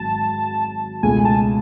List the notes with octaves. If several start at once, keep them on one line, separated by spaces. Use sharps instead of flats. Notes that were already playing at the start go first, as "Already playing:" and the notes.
Already playing: G#1 G#2 F#3 A5
C#2 B2 A3 G#5
A5